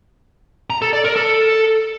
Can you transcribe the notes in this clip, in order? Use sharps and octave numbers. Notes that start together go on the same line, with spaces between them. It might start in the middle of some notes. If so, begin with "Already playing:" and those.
A#5
A4
D5
A#4
A4